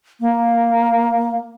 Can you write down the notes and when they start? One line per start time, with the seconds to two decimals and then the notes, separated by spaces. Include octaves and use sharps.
0.20 A#3